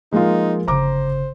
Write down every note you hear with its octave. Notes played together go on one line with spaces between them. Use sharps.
F3 G#3 A#3 D#4 F4
G1 C#3 C5 A#5 D6